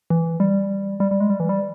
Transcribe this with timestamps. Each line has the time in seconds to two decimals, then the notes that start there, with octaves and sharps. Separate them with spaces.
0.10 E3
0.40 G3
1.00 G3
1.11 G3
1.20 G#3
1.30 G3
1.40 E3
1.49 G3